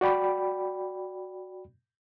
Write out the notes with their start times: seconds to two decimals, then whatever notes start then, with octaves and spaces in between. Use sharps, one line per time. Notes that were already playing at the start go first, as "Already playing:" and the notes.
0.01 F#4 D5 G5 B5